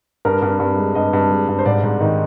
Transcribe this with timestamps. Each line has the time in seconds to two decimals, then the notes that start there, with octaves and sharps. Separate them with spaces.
0.25 G2 A#4
0.42 G2
0.60 G2
0.78 G#3
0.95 G2 D#5
1.13 G2
1.31 G#3
1.48 G2
1.58 C5
1.65 G#2 D5
1.83 G#2
2.00 D#3 D#4